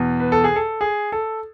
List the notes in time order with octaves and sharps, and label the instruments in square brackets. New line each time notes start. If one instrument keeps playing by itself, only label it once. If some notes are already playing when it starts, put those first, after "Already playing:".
Already playing: [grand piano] E2 B2
B4
A4
G#4
A4
G#4
A4